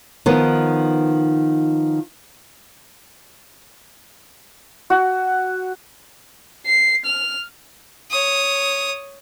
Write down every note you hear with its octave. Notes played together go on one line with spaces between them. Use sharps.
D#3 F3 B3
F#4
C7
F6
C#5 D#6